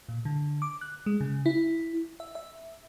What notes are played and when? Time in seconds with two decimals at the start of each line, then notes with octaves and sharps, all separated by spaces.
0.09 A#2
0.25 D3
0.62 D6
0.81 F#6
1.06 G#3
1.21 C#3
1.46 E4
2.20 E5
2.35 E5